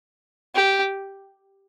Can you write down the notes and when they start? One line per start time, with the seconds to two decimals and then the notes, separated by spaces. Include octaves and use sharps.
0.55 G4